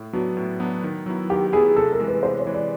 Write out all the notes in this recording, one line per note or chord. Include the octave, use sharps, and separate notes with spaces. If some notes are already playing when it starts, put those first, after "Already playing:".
Already playing: A2
F#3 B3 D4 F#4
A2
F#3 B3 D4
D#3
F#3 B3 E4
D#3 G4
F#3 B3 E4 G#4
C3 A4
A#4
E3 G#3
B4
C3 C5
C#5
E3 G#3
D5